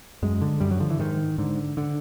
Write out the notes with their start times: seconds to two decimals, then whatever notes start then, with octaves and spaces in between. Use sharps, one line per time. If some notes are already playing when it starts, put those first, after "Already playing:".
0.23 F#2 G#3
0.41 D3
0.60 F#2 G3
0.71 F#3
0.80 D3 F3
0.90 E3
0.99 G#2 D#3
1.38 G#2 D3
1.77 D3